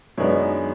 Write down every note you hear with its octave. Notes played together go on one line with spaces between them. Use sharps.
F#2 D#3 G#3 B3 D4 C#5